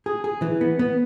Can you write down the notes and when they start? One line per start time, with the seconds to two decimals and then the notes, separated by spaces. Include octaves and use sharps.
0.06 G#4
0.24 G#4
0.42 E3
0.61 B3
0.79 B3